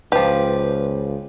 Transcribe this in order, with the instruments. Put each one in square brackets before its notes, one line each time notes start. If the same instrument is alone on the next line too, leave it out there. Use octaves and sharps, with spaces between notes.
[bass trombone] C#2 [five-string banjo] F3 G4 [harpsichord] B4